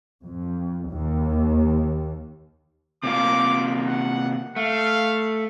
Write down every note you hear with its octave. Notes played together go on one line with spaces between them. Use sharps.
F2
D#2
C3 A#3 F4 D6
F#5
A3 F5